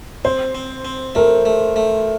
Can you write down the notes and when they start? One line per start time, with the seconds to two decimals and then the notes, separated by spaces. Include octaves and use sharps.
0.25 C4 C5
0.55 C4
0.85 C4
1.15 A3 A#4
1.46 A3
1.76 A3